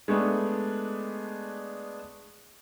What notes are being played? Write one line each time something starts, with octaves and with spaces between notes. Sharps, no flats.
G#3 A3 B3 D4